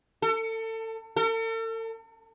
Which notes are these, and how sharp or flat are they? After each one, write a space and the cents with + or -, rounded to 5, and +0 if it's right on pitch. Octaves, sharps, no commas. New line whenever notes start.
A4 +30
A4 +45